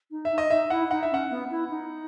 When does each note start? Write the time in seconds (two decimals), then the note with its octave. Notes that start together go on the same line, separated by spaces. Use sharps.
0.11 D#4
0.25 E5
0.31 D#4
0.38 D#5
0.50 D#4 E5
0.70 E4 F#5
0.91 D#4 F#5
1.03 E5
1.11 C#4 F#5
1.30 B3
1.50 E4
1.70 D#4